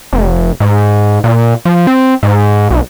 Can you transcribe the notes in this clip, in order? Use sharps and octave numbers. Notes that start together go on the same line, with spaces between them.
F1
G#2
A#2
F3
C4
G#2
B1